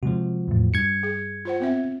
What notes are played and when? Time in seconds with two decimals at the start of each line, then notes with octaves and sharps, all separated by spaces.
0.03 C3 F3 G#3 F#4
0.48 E2 A2
0.74 G2 G#6 C#7
1.03 G#4
1.45 F4 C5 F#5
1.60 B3 C4 E5